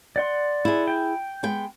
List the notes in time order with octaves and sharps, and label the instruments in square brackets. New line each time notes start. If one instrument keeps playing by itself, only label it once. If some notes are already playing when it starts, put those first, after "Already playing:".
[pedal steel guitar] D5 F#5 C6
[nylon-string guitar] E4 G#4
[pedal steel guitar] G5
[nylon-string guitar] G#3 B3 G5